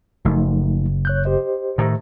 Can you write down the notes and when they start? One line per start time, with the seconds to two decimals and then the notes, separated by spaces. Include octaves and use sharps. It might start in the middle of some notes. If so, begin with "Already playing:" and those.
0.25 F#1 F3 A3 D#4
1.05 C#5 F#6 G6
1.25 G4 C5 D#5
1.78 A2 D#3